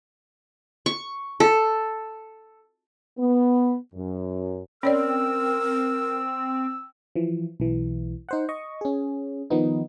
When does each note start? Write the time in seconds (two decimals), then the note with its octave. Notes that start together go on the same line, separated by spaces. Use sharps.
0.86 C#6
1.40 A4
3.18 B3
3.94 F#2
4.83 C4 C#4 A#4 C#5 D5 E6
7.15 E3 F3
7.60 B1 E3
8.29 D#4 C5 F#5
8.49 D#5 C#6
8.81 C#4 G#4
9.50 D#3 F3 B3 D#4